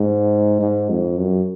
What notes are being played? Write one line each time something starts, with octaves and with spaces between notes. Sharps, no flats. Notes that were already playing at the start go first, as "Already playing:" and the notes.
Already playing: G#2
G#2
F2
F#2